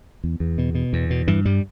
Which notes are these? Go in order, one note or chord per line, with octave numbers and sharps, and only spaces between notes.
E2
E2
B2
B2
E2
B2
G2 E3
G2 G3